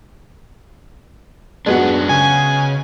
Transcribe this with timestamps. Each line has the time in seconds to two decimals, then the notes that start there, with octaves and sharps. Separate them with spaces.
1.66 F#2 G#3 B3 D4 F#4
2.09 C#3 G#5